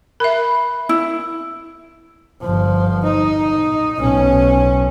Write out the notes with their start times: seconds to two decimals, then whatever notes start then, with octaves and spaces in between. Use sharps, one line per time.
0.20 A#4 E5 B5
0.89 E4
2.41 G1 F3
3.04 D#4
3.97 B1 C#4